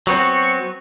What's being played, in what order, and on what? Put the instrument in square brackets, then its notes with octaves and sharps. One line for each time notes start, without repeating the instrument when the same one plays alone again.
[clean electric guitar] F#3 B3 C4 [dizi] C#6